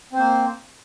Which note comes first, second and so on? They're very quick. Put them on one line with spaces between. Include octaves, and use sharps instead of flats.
C4 C5 A#3